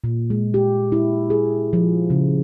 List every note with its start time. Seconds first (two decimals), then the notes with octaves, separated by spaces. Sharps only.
0.04 A#2
0.30 G#3
0.54 G4
0.92 E4
1.30 G#4
1.73 F3
2.10 C#3